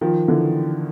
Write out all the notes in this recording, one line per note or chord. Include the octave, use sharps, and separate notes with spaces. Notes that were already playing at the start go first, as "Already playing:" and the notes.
D#3 F3
D3 E3